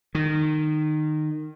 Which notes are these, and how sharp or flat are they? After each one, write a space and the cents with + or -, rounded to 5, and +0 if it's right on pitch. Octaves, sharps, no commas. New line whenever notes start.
D#3 -20